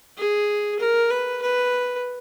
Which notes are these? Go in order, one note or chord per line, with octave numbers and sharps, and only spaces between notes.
G#4
A#4
B4
B4